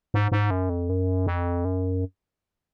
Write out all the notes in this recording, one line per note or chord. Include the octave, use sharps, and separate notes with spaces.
G#2
G#2
F#2
F2
F#2
F2
F#2